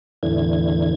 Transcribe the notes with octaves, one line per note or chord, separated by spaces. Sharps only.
E2 A2 D3 E3 G#6